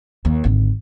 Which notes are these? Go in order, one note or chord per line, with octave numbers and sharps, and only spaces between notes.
D#2
G#1 D3